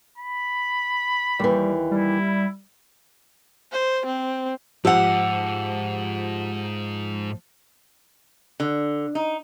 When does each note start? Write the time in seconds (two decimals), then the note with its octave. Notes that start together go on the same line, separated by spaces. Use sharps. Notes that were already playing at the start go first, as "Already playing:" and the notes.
0.18 B5
1.39 D#2 E3 G3
1.91 G3 E4
3.72 C5
4.06 C4
4.85 G#2 F3 G4 F#5 E6
8.60 D3
9.15 D#4